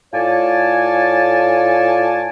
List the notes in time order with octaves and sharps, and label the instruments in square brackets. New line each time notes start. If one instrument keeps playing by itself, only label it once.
[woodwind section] A2 F4 C#5 D5 G#5 A5